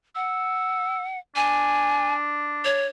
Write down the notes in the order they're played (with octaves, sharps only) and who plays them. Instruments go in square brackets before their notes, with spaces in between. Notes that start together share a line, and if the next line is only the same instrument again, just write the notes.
[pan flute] F#5 [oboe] E6
[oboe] D4 [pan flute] G#5
[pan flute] C#5